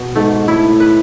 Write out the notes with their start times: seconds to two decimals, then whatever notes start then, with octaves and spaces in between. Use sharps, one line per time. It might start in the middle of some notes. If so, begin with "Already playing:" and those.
Already playing: B2
0.15 G#2 A3
0.47 A2 E4
0.80 B4